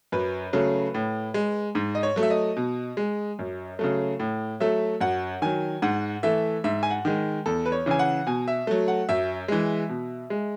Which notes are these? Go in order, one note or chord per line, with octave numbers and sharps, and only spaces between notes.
F#2 B4
C#3 F#3 A3
A2
G#3
G#2
D#5
C#5
F#3 A3
E5
D#5
B2
G#3
F#2
C#3 F#3 A3
A2
F#3 A3 E5
F#2 F#5
D#3 F#3 G#5
G#2 F#5
E3 A3 E5
G#2 E5
G#5
F#5
D#3 G#3
E2 A4
B4
C#5
C#3 E3 G#5
F#5
B2 G#5
E5
F#3 A3
F#5
F#2 E5
E3 G#3
B2
G#3